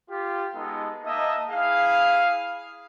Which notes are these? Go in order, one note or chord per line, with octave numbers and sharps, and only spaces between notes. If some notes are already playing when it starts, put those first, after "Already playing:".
F4 G4
G#3 B3 D#4 A4
A#3 D#4 D#5 E5 A5
E4 G#4 F5